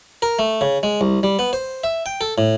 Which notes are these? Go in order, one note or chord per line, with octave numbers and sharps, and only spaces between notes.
A#4
A3
C#3
G#3
C2
G3
B3
C5
E5
G5
A4
A2